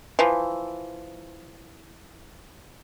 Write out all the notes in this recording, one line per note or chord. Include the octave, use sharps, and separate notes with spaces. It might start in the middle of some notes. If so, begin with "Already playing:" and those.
E3 F3